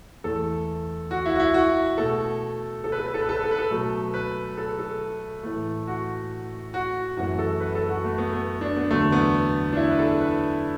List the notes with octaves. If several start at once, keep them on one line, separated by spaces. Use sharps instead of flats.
E2 E3 A3 A4
F#4
E4
F#4
E4
F#4
B2 A3 A4
A4
B4
A4
B4
A4
B4
A4
B4
A4
B4
A4
B2 F#3 A3
B4
A4
A4
A2 E3 A3
F#4
F#4
F#2 E3 A3 F#4
A4
B4
A4
F#4
A3
B3
B3
D4
B3
E2 D3 F#3 A3
B3
D4
E4
B4
A4
B4